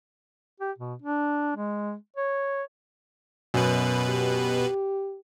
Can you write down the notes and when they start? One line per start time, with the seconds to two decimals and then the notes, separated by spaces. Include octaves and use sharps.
0.60 G4
0.78 B2
1.02 D4
1.57 G#3
2.17 C#5
3.54 F#2 B2 B4
4.10 G4